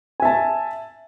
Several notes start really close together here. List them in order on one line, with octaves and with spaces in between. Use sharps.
G#5 E5 A5